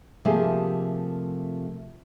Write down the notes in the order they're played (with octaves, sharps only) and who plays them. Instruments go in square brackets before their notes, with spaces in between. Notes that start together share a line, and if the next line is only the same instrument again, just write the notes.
[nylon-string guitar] C3 F3 A3 A#3 G4 G#4